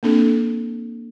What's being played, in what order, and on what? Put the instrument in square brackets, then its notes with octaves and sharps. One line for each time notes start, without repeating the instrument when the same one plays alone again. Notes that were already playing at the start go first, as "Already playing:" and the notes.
[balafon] A#3 C4 D4 A4